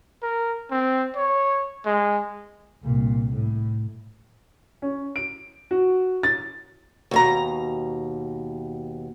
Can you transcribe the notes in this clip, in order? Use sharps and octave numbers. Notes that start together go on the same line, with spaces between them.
A#4
C4
C#5
G#3
C2 A#2
A2
C#4
D7
F#4
A6
D#2 B2 A#5